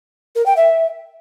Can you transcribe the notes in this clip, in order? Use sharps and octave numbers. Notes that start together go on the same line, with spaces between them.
A#4
G5
E5